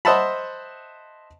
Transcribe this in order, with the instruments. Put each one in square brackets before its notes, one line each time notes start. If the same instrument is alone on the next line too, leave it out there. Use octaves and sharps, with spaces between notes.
[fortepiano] C5 D#5 E5 F#5 A5 B5